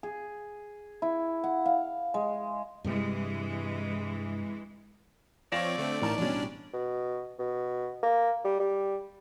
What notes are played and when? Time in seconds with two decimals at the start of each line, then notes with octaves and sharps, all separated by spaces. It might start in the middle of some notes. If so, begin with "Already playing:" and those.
0.03 G#4
1.02 E4
1.44 F#5
1.66 F5
2.14 G#3
2.84 G2 C3 E3 G3 G#3
5.52 F3 C4 C#5 D5 F5 A#6 E7
5.78 D3 A3 C4
6.02 A1 A2 D#4 A#4 A5 A#5
6.18 A1 B2 G3 C#4 D4
6.73 B2
7.39 B2
8.03 A#3
8.44 G3
8.59 G3